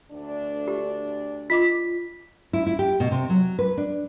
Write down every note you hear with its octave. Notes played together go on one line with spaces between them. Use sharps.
D2 D4
G4
F4 D#5 D6 B6
E4
E4
G4
B2
C3
F#3
B4
D4